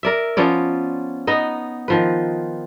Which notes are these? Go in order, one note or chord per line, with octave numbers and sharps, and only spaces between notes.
A#4 D5 E5
F3 B3 C#4 D5
B3 D#4 D#5
D#3 F3 B4